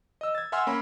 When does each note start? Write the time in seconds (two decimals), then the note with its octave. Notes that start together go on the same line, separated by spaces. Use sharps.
0.21 D#5 E6
0.35 G#6 A6
0.52 E5 F#5 G#5 C6 E6 F6
0.67 A#3 C#4 B5